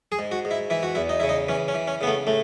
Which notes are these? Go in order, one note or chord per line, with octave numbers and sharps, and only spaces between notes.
G#4
G#2
F#4
G#2
E4
E3 E4
F#4
E2 E4
D#4
C#3 E4
D#4
E3 C#4
C#4
E3
C#4
C#3 B3
A3
A2 A3